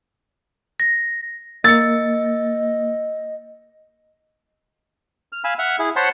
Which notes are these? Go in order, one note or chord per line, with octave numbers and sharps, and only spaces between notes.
A#6
A#3 D#5 E6 A6 C#7
F6
F5 G#5 B5 E6
E5 F#5 F6
E4 G#4
C5 C#5 F#5 A5 B5 C6